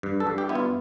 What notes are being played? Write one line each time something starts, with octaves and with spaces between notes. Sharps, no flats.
G2
A4
G2
G4
B3 E4
F4